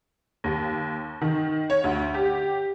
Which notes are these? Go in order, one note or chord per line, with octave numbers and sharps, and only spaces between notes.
D#2
D#3
C#5
D2
G4